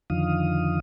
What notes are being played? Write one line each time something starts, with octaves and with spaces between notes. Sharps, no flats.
F2 D3 D#3 F3 F5 D#6